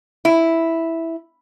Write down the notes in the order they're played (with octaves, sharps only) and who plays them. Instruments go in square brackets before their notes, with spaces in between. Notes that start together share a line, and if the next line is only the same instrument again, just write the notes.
[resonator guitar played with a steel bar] E4